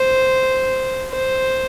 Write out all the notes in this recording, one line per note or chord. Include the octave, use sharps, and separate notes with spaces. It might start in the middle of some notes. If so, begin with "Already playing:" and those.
Already playing: C5
C5